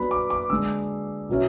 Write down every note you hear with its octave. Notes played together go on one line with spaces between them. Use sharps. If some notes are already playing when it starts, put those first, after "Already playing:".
Already playing: F#3 B3 D4 B5
D6
D6
D3 G#3 D4 E6
B2 F#3 C#4 E4